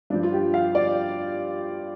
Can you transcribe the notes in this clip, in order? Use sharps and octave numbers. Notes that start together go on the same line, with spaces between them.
G2 F3 D4
F4
G4
F5
D5